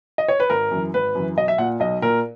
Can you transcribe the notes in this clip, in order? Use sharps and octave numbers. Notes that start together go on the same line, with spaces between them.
D#5
C#5
B4
G#1 A#4
F#2 E3
G#1 B4
F#2 E3
B1 D#5
E5
A#2 F#5
B1 D#5
A#2 A#4